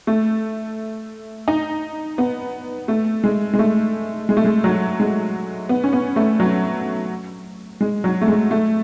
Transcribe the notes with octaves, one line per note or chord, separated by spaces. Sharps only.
A3
D#4
B3
A3
G#3
G#3
A3
G#3
A3
G#3
F#3
G#3
B3
C#4
B3
A3
F#3
G#3
F#3
A3
G#3
A3